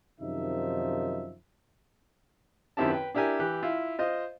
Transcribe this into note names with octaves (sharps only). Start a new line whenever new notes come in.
F#2 C3 D#3 F3 D#4 E5
F#2 D#3 C4 E4 G4 A5
B4 G5
D4 E4 G4 A#4 G#5
E3 G4 F#6
E4 F4
F4 C5 D#5